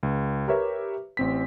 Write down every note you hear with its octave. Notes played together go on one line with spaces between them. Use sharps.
C#2
G4 A#4 B4 C#5 E5
A1 C4 B6